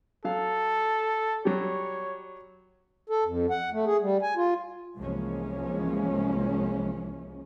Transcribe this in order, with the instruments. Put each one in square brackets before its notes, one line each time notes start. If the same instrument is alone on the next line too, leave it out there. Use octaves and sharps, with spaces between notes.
[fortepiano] F#3 F5 [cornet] A4
[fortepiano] F#3 G3 [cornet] C#5
[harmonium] A4
F2
F#5
A3
G#4
G3
G#5
F4
[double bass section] C2 E3 F3 G#3 A#3 C#4